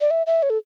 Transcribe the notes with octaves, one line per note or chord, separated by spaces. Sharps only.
D5
E5
E5
C#5
A4